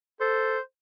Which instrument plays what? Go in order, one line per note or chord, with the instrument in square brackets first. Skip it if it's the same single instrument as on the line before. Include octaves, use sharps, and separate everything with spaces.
[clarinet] A4 [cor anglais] C5